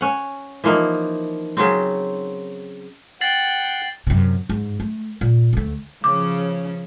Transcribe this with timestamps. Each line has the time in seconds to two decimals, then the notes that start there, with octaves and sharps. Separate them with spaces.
0.01 C#4 F#5
0.64 E3 F3 A#3 D#4
1.57 C#3 F#3 C4
3.21 F#5 G5 A6 C7 F#7
4.07 F#2 C3
4.49 G#2
4.80 A3
5.21 A#2
5.53 D2 A3
6.04 C#3 F3 C#4 D6